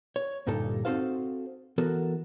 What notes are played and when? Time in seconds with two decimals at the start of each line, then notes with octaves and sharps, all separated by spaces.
0.16 C#5
0.47 D2 G2 A#2 G3 D#4 A4
0.85 C4 D#4 F#4 A4 C5 F5
1.78 E3 B3 F#4 A4 A#4